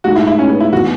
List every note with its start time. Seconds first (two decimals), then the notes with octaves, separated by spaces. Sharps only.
0.04 A2 G#3 D#4 F#4
0.15 E4
0.27 E4
0.39 C#4
0.49 B3
0.60 E4
0.72 E3 B3 F#4